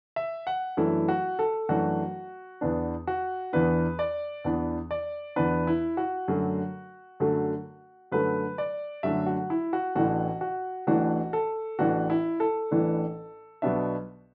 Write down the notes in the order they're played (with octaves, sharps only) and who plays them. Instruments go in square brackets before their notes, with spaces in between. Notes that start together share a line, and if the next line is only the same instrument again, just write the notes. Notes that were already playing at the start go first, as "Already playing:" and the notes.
[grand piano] E5
F#5
F#2 E3 A3 D4 E4
F#4
A4
F#2 E3 A3 D4 F#4
E2 E3 B3 D4
F#4
E2 E3 B3 D4 B4
D5
E2 E3 B3 D4
D5
E2 E3 B3 D4 B4
E4
F#4
F#2 D3 F#3 A3
F#2 D3 F#3 A3
F#2 D3 F#3 A3 B4
D5
F#2 D3 F#3 A3 E5
F#4
E4
F#4
A1 A2 E3 D4 F#4
F#4
A1 A2 E3 D4 F#4
A4
A1 A2 E3 D4 F#4
E4
A4
A1 A2 E3 D4
B1 B2 B3 D4 E5